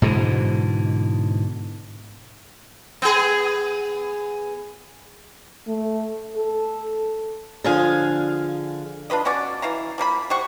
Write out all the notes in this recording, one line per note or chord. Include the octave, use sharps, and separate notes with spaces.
G#2 B2 D3 E3
B3 G#4
A3
A4
D3 F3 G#4 F5 G#5
D4 F4 B4 D#5
B2 C#4 F#4 D5
E3 F5 A#5
F3 A#3 A#4 B5
G3 C5 F#5 C#6